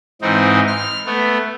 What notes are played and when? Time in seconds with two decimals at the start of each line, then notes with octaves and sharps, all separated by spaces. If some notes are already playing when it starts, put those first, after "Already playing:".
0.22 G#2 E3 C4 D#4
0.67 F6
1.06 A3 B3